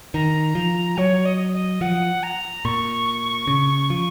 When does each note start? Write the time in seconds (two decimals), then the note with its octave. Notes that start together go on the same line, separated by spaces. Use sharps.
0.14 D#3 A#5
0.55 F3
0.97 F#3 C#5
1.25 D#5
1.53 D#5
1.81 F3 F#5
2.22 A#5
2.64 A#2 C#6
3.47 C#3
3.90 F3